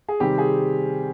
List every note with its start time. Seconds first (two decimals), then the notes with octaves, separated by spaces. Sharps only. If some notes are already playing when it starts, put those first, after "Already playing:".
0.09 G#4
0.20 C3 D#3 G3 C4 G4
0.38 G#4